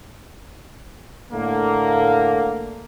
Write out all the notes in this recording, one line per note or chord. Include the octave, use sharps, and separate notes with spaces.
A2 D3 A3 A#3